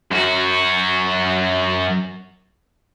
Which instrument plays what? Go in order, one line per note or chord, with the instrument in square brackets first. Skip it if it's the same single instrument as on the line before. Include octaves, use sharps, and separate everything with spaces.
[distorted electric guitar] F#2 F#4